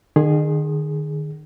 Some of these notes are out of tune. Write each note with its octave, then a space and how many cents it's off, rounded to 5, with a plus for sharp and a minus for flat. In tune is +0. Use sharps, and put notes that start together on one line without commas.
D#3 -40 G#4 +0